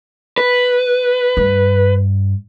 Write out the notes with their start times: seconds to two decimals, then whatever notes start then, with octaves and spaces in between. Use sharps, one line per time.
0.38 B4
1.37 G2